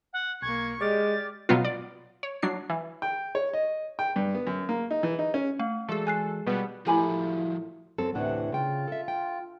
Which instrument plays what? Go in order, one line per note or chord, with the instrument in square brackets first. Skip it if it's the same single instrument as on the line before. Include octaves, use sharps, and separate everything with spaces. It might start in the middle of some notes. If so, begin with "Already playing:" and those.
[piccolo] F#5
[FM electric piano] B1 [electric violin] A#3 C#6 [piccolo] G#6
[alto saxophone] G#3 [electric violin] G4 [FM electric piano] D5 D6 F6 [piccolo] A6
[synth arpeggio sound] B2 F#3 B3 F4
D5
C#5
F#3 D4 C7
E3
[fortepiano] G5
C#5
D#5
G5
G2
B3
F#2
A#3
D#4
E3
D#4
C#4
[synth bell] A3 [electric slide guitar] F#5
[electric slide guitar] E3 F#4 D5 [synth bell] G#3 G#4 [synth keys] A4
[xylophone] G#5 F#6 C7
[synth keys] B2 G3 B3
[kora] A2 A#4 [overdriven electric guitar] F3 F#3 [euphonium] E4 [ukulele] G4 G#5 B5
[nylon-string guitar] F#2 C4 A4
[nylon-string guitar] D2 A2 D4 [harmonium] C3 E3 F#5
[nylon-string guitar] C#3 G5 [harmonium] F4
[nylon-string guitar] A4 E5
G5